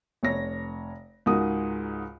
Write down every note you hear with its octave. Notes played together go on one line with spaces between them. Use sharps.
F1 C#5 A#6
C#2 G#2 F#4 A#4 D#6